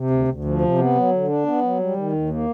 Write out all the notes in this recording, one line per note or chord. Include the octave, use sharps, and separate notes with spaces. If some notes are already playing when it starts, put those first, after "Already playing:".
Already playing: C3
D2
D2
F3
C3
B3
F#3
D3
D4
B3
F#3
G3
D#3
D#2
A#3